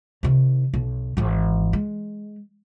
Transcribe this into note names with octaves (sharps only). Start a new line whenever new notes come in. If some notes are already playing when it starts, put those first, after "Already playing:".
C3 D#3
B1
G#1 E3
G#3